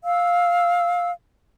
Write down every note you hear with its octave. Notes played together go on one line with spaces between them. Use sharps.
F5 E6